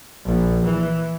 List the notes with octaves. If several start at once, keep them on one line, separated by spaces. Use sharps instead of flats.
A#1
E3